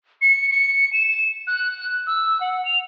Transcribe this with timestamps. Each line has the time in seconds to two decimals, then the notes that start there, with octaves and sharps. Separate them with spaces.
0.21 C#7
0.51 C#7
0.93 E7
1.47 F#6
2.07 E6
2.41 F#5
2.65 F7